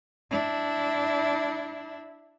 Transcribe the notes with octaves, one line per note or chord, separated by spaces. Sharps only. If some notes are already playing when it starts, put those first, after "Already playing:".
D4 E4